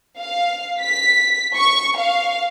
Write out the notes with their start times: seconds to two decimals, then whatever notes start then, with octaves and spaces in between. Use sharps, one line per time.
0.19 F5
0.81 B6
1.56 C#6
1.97 F5